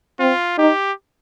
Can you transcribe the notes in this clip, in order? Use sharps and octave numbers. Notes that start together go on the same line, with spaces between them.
C4 F4
D#4 G4